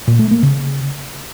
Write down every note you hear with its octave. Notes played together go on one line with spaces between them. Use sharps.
A#2
A3
A#3
C#3